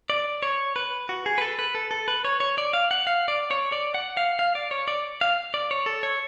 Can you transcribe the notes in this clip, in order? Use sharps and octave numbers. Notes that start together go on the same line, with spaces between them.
D5
C#5
B4
F#4
G#4
B4
A4
B4
A4
A4
B4
C#5
C#5
D5
F5
F#5
F5
D5
C#5
D5
F#5
F5
F5
D5
C#5
D5
F5
D5
C#5
A4
C#5